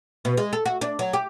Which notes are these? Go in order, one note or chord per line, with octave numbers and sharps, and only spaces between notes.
B2
G#3
A4
F#4
D4
F#3
G4